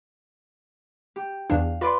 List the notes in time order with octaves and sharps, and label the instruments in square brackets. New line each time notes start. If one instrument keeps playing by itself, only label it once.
[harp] G4
[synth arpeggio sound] E2 E3 D4 [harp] F5
[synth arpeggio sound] F4 [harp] B4 D5 C6